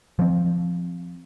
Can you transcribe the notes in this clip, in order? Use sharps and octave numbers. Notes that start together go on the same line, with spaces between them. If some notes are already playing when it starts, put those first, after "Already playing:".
F3 C4